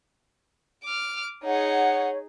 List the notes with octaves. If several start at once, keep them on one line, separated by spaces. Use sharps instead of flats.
D6 F6
D#4 G#4 C#5 F#5